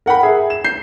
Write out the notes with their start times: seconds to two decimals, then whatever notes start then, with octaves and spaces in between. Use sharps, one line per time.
0.06 A#4 F#5 G5 B5
0.23 G#4 E5
0.50 E7
0.64 G6 C7